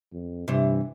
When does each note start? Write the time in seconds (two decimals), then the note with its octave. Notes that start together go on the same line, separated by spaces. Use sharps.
0.12 F2
0.48 G2 C3 E3